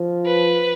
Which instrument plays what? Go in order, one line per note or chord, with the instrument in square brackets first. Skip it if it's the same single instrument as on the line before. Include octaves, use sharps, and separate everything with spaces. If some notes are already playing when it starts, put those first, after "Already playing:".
Already playing: [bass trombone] F3
[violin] B4